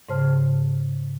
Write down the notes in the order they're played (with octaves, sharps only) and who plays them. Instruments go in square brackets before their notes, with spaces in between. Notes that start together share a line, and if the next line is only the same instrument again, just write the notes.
[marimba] G#2 C#3 C5 A5 F6